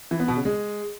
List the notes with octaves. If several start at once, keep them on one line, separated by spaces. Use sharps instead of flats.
E3
B3
B2
C#3
G#3